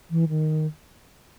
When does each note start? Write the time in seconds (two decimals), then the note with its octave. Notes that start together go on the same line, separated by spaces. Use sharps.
0.11 E3
0.29 D#3